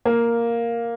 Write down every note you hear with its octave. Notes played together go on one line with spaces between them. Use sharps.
A#3